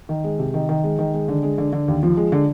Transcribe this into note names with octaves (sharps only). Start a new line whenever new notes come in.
D#3
G#3
C3
D#3
D#3
G#3
D#3
G#3
D3
G#3
D3
D3
D#2
F3
G#3
D3